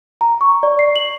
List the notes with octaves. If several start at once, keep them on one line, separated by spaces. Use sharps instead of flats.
A#5
C#6
D5
C7
F#7